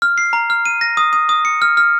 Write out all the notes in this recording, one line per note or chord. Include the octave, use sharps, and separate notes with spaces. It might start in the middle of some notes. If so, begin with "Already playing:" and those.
F6
C7
A#5
F6
D#7
A#6
D#6
D#6
D#6
C#7
F6
F6